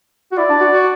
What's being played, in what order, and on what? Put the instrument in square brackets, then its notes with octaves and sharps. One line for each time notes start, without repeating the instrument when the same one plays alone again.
[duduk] F#4
[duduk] E4 [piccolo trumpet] D5
[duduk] D4
F#4
F#4